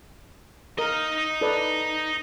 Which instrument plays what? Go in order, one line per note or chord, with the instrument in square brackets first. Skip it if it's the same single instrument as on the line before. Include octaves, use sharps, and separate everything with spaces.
[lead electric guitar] D#4 D#5 [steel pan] A#4
[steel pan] A4 B4 D5